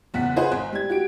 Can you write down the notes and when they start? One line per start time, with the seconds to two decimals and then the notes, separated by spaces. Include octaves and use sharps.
0.14 F#1 E2 F#5 F#6 B6
0.36 G#4 B4 C5 F#5 C6 F#6
0.52 G#1
0.72 G3 G#6
0.89 F#4 G4 D7